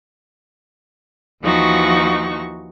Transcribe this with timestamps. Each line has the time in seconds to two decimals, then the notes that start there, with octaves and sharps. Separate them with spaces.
1.42 D#2 E3 F3 D#4 F#4 C#6